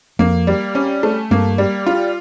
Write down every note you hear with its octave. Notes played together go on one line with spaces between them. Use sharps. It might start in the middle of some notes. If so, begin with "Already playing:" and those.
F2 A#3
G3
C#4
A3
G2 A#3
G3
F4